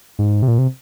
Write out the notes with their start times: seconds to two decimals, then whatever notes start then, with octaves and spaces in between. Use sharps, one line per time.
0.19 G#2
0.42 C3
0.48 A#2
0.58 C3